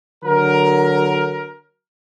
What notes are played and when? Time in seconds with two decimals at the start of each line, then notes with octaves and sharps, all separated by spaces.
0.24 D3 F#3 A#4